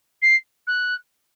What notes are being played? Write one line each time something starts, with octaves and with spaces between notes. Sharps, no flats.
C7
F#6